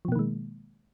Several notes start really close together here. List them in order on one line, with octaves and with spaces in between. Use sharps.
F3 B2 A#3 D#3 G#3